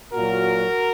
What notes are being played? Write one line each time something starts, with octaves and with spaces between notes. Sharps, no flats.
A#2 F#3 F#4 A#4